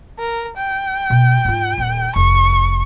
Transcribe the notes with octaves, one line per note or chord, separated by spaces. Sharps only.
A#4
G5
B2
G#2 F4
D#1 B3
F1 C#6